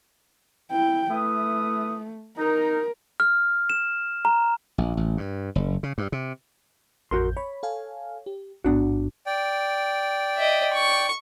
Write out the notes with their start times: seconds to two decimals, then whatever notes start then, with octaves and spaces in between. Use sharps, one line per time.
0.71 E4 G5
1.11 A3 E4 B4 D#6
2.38 D#4 A#4
3.20 F6
3.70 E7
4.25 A#5
4.78 A#1
4.97 A1
5.18 G2
5.55 F#1
5.83 C#3
5.98 G2
6.12 C3
7.11 A1 F2 F#4 A#4 C6 G6
7.37 C#5 B5
7.63 A4 F5 G#5
8.26 G4
8.64 A1 G#2 B3 D4 F#4
9.26 D5 G5
10.37 D#5 E5
10.73 C#6